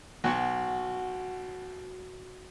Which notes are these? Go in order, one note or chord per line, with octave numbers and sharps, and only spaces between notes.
B1 F#4